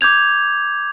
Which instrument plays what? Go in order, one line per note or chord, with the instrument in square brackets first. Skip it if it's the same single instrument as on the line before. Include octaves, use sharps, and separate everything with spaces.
[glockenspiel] D6 G6 G#6 F7